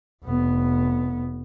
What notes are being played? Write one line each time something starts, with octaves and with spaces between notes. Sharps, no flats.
F1 B3